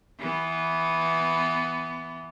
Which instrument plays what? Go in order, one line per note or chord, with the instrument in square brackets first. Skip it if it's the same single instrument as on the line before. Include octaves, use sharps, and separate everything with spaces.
[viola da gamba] E3 B3